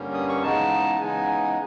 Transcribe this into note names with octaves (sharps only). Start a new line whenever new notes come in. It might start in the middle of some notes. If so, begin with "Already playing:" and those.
Already playing: G2 D3 G3 A#3 C#4
D#6
C#6
C#3 E3 G#3 B3 D#4 A5
A5
C#3 E3 G#3 B3 D#4 G#5